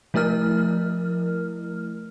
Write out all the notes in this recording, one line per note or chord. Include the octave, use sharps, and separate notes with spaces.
F3 A3 E4 A#4 F6